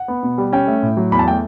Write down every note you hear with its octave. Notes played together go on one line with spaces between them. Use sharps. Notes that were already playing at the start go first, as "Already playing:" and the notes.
Already playing: F#5
B3
B2
G3
C#4 G5
A3
A2
F#3
E2 B5
A5
A3 G5